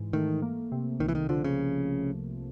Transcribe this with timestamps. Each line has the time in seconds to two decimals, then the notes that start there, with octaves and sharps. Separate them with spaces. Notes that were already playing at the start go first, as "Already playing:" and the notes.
Already playing: G#2 E3
0.13 D#3 A3
0.42 A#3
0.72 C3
1.00 C2 D#3
1.08 E3
1.15 D#3
1.29 D3 F3
1.44 C#3